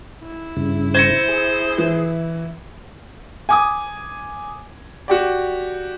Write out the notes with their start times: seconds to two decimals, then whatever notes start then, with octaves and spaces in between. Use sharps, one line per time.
0.23 E4
0.57 G2 C#3
0.95 C5 G#6 A#6 C#7
1.29 G#4
1.78 E3
3.49 G#5 D6 D#6
5.08 F#4 G4 D5